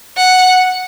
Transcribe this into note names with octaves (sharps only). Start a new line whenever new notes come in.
F#5